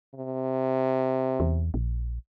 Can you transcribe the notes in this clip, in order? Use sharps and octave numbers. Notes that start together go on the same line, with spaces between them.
C3
E2
A#1